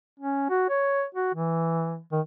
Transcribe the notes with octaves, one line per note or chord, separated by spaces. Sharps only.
C#4
F#4
C#5
F#4
E3
D#3